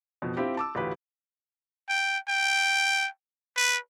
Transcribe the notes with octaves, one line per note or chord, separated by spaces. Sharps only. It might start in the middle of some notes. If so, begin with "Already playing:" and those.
F2 B2
C4 E4 F4 G4
A5 D6 E6
A1 D2 F4 G4 B4
G5
G5
B4